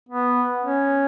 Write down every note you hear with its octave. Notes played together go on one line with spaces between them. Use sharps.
B3
C#4